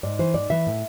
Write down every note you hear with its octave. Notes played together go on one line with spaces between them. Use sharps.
G#2 D5
E3 C5
G#2 D5
E3 E5
A2